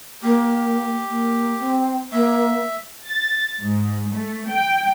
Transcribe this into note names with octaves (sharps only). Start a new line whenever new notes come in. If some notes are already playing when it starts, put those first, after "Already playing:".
A#3 G4
A#3
C4
A#3 E5
A6
G#2
A3
G5